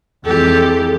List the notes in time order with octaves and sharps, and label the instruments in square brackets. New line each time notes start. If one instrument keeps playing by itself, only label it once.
[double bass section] F2 E3 G#3 [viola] G4 A4